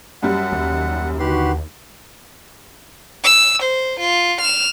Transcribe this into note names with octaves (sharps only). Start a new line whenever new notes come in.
F#2 G3 F#5
D#2
D3 D#4 F#4 G4 B4 C6
E6
C5
F4
F6 E7